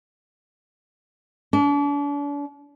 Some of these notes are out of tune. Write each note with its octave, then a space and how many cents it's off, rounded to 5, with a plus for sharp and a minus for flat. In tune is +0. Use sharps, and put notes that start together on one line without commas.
D4 -40